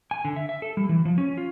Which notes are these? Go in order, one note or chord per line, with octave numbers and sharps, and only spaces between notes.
G#5
D3
E5
E5
A4
G3
E3
F3
C#4
F4